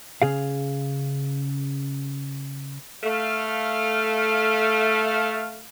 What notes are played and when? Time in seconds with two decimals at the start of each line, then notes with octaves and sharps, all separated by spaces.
0.22 C#3 G#4 F5
3.04 A3 F5